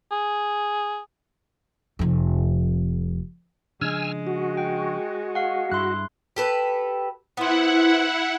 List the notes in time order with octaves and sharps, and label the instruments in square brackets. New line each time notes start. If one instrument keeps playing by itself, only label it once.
[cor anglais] G#4
[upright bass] F1 F2
[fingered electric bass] C#3 F3 D4 [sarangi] G#3 [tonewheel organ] G#5 E6 F6
[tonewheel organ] F#4
[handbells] G5
F5 F#5
[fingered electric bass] G2 [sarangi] E4 [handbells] C6 F#6
[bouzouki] G4 A4 B4
[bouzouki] B3 C5 [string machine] E4 F#5